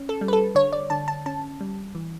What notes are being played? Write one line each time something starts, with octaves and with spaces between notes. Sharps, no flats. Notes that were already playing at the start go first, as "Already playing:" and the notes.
Already playing: C#4
A4
G3
B4
A4
D3 C#5
D5
D3 A5
A5
C#4 A5
G3
E3